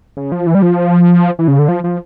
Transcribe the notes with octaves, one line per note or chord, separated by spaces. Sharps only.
C#3
F3
E3
G3
F3
E3
C#3
D3
F3
F3